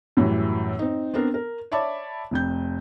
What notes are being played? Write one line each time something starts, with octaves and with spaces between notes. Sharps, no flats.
F#2 A2 E3 G3
C4 D#4
B3 C4 D4 A#4
A#4
C#5 D5 E5 A5 B5 D6
F1 F2 G6